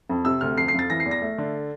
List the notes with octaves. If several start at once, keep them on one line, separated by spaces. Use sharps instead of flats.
F2
C3 E6
D2 F6
F2 C7
C7
F2 A6
E3 A#6
C7
E2
A#6
A3
D3